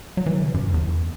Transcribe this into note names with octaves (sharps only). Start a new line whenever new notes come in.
F#3
E3
D3
C3
F#2
E2